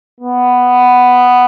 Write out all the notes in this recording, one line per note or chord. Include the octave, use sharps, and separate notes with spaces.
B3